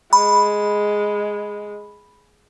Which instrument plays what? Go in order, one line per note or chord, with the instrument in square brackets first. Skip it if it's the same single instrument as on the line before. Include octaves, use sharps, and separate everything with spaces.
[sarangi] G#3 [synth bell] B5